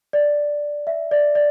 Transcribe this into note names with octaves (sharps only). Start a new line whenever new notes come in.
D5
E5
D5
D5